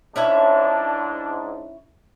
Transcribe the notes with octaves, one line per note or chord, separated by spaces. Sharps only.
G#2 C#4 D4 E4 E5